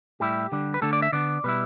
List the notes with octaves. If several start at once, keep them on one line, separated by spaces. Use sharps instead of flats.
A2 G3 E4 G4
D3 G3 D4
B4
D3 A3 D4 A4
D5
E5
D3 B3 D4 D5
B2 G3 E4 B4